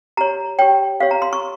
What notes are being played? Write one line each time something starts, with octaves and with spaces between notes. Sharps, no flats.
G4 C#5 A#5
G4 C#5 G5
G4 C#5 F5
A#5
C6
C#6